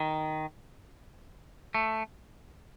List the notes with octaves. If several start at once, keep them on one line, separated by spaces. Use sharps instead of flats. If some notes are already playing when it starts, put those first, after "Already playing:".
Already playing: D#3
A3